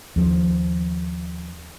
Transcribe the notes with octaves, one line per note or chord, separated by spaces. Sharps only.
D#2 F3